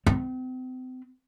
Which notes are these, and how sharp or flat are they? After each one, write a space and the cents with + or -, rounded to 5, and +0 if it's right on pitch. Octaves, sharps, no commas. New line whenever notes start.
C4 -40